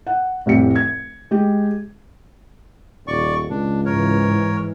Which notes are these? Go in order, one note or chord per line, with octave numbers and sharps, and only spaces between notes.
F#5
F1 C2 A2 G4 C#7
G#6
G#3 G4
D#1 D5 C#6
C#2 D4
G#2 E3 A#4 C#5